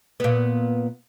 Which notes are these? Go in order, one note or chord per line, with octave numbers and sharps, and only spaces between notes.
A#2 B3